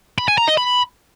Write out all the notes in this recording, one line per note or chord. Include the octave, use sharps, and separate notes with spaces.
B5
G#5
A#5
D#5
B5